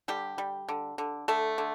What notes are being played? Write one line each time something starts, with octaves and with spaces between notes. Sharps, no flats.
D3 G3 G4
G3
D3
D3
D3 A3 A4
D3